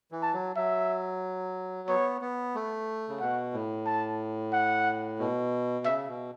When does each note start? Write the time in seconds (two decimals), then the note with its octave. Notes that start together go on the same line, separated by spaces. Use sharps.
0.12 E3
0.23 A5
0.33 F#3
0.56 F#3 E5
1.88 B3 C#5
2.21 B3
2.55 A3
3.09 C#3
3.20 B2 F#5
3.54 A2
3.86 A5
4.53 F#5
5.19 B2
5.85 C#3 E5
6.08 B2